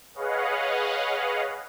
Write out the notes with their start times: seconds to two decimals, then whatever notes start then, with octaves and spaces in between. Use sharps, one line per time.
0.14 G#4 B4 C#5 D#5 F5 F#5